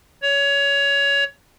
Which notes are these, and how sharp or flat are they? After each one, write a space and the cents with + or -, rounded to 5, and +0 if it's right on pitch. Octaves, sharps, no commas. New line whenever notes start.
C#5 +20